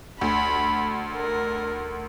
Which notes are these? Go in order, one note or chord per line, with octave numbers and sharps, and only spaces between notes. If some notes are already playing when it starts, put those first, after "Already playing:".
D2 B5
A#4